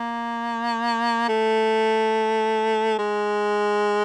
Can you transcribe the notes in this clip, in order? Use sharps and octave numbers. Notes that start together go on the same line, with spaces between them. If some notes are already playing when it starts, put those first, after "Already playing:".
Already playing: A#3
A3
G#3